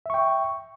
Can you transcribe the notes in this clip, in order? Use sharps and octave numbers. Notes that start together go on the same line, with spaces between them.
E5 G5 C#6